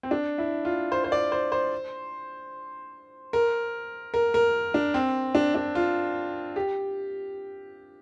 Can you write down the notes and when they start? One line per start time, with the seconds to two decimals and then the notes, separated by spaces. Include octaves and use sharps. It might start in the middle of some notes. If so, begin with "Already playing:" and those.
0.03 C4
0.11 D4
0.38 E4
0.65 F4
0.92 C5
1.04 C5
1.12 D5
1.32 C5
1.52 C5
3.33 A#4
4.14 A#4
4.34 A#4
4.74 D4
4.94 C4
5.35 D4
5.55 D4
5.75 F4
6.56 G4